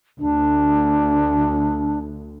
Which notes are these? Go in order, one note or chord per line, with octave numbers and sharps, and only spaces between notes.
D2 D4